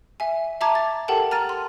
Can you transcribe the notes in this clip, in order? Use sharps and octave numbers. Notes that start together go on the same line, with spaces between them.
E5 G#5
E5 A5 A#5 D6 G#6
A6
G4 A4 A#4 F#5 G5 A5
A#5 F6 A6 D#7
C6